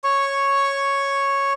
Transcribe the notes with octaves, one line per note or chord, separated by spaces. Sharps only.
C#5 C#6